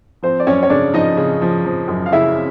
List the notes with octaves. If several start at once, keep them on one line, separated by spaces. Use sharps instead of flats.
F3 C4 C5
D5
F#2 C#4 C#5
C#5
C#3 D4 D5
F3 D#4 D#5
C#3
F3
F3
F#2
F5
C#3 E4 E5